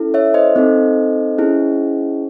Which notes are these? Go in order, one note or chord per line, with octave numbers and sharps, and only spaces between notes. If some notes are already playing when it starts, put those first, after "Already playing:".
Already playing: C#4 E4 A4
C#5 E5
C5 D#5
C4 D#4 A4
C#4 E4 G#4